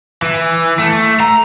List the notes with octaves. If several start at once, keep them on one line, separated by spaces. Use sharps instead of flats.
E3
A3
A#5